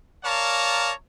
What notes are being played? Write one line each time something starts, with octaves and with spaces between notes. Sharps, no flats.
A#4 C#5 D5 F5 A5 A#5